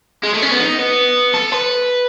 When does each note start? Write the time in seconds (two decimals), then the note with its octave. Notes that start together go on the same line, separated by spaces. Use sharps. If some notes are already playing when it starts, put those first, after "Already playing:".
0.24 G#3
0.34 A3
0.43 C#4
0.52 B3
0.61 D#4
0.79 B3
1.34 A4
1.52 B4